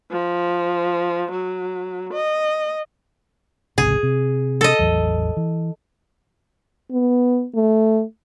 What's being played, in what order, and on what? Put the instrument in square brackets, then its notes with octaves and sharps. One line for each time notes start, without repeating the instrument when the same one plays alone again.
[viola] F3
F#3
D#5
[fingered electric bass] G#1 C#2 C3 [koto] G#4
[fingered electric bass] C3
[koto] A4 D#5
[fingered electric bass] A1 E2 F#3
E3
[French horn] B3
A3